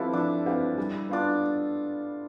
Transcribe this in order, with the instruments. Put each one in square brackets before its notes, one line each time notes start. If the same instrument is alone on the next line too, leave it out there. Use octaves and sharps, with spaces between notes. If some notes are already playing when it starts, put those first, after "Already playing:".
Already playing: [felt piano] F3 C4 G4 B4 F5 [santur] E4 A4
[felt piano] F3 [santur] D4
[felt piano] C4 G4 B4 F5
G3
[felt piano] B3 F4 [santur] D4